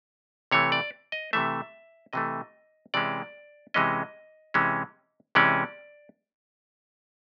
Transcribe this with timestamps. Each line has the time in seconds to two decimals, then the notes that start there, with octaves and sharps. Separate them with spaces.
0.51 C3 E3 A3 C#5
0.72 D5
1.12 D#5
1.33 C3 E3 A3 E5
2.13 C3 E3 A3 D#5
2.94 C3 E3 G#3 C#4 D5
3.74 C3 E3 G#3 C#4 D#5
4.54 C3 E3 G#3 C#4
5.35 C3 E3 G#3 C#4 D5